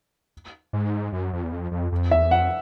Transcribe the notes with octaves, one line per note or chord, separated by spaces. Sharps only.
G#2
F#2
F2
E2
F2
F2
F2
E2 E5
F2 F#5